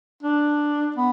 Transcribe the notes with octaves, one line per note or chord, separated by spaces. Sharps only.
D4
B3